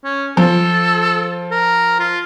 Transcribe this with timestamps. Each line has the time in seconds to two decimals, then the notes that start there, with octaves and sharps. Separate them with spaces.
0.04 C#4
0.37 F3 A4
1.51 A#4
1.99 F4